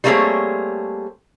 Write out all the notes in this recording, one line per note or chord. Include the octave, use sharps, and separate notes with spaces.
G3 A3 A#3 C4 G#4 C#5